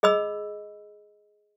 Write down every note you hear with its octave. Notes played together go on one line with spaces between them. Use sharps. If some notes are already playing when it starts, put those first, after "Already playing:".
G#4 D#5 B5 E6